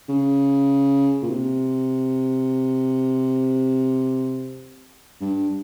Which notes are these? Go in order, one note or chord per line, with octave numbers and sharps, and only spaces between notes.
C#3
A#2
C3
G2